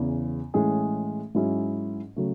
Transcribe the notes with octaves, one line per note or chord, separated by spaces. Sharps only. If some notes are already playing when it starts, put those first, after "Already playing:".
Already playing: E2 C#3 E3
A2 E3 G#3 C#4 G#4
G#2 F#3 C#4 E4 G#4
C#3 F#3 A3